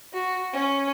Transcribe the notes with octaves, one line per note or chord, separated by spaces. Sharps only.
F#4
C#4